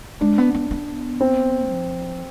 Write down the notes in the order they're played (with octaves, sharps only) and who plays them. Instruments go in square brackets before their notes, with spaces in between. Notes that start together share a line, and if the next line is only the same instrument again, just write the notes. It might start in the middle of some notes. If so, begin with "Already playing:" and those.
[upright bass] G#3 [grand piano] D4
[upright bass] B3
B3
B3
[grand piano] C4
[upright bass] F3